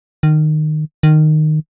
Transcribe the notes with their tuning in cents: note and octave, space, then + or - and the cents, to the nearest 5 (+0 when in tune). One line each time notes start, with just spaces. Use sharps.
D#3 -20
D#3 -15